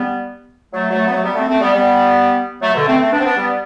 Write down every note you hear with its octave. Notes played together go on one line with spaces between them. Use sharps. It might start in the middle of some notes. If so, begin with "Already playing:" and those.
Already playing: G3 B3
F#3 A3
F#3 A3
B3
F#3 A3
G3 B3
A3 C4
A3 C4
G3 B3
G3 B3
F#3 A3
B2 D3
A3 C4
A3 C4
B3 D4
C4
B3 D4
G3 B3